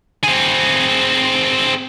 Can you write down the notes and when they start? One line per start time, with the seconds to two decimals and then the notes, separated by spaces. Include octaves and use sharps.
0.24 C4 G#4